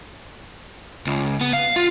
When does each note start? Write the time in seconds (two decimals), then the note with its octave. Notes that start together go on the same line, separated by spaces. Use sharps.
1.07 C#2
1.41 B3
1.53 F5
1.76 F4